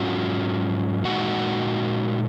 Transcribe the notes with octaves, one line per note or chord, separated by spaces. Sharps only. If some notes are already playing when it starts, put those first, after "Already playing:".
Already playing: G#2 F#3 C#4 F4 F#4 F#5
A#2 G#3 D#4 F#4 F#5